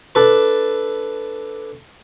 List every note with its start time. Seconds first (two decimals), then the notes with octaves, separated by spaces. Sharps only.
0.15 D4 A4 B4